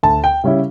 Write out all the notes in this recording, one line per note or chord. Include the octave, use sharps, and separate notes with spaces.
D2 A5
G5
C#3 G3 C#4 E4